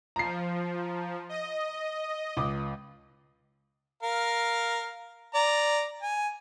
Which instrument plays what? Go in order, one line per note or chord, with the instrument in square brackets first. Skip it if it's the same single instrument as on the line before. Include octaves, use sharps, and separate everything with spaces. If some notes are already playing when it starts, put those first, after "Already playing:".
[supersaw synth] F3 [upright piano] A#5 C7
[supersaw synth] D#5
[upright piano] C#2 D6 D#6
[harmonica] A#4 F5
D5 A#5
G#5